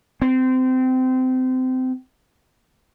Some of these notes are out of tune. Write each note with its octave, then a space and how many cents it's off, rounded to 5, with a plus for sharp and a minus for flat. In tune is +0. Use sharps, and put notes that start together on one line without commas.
C4 -25